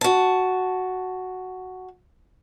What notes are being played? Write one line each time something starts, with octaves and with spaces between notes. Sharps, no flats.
F#4 A5